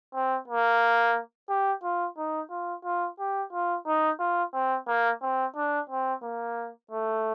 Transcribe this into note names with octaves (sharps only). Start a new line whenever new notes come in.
C4
A#3
G4
F4
D#4
F4
F4
G4
F4
D#4
F4
C4
A#3
C4
D4
C4
A#3
A3